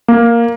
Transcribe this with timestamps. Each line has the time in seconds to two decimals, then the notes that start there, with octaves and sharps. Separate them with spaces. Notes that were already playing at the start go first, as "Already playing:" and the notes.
0.08 A#3